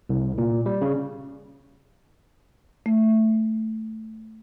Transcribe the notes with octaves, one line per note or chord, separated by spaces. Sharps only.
C2
A#2
G3
C#3
A3